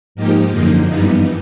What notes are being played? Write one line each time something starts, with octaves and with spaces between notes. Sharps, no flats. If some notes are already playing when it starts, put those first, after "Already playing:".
G#2 F3 A#3 D#4 G4
F#2 D3 F3 A#3 D#4
G2 E3 G3 B3 D#4